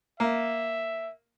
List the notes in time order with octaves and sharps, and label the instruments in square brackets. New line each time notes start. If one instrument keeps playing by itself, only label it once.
[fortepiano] A#3 [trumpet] E5